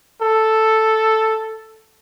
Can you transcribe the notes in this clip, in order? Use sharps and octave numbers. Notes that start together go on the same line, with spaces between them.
A4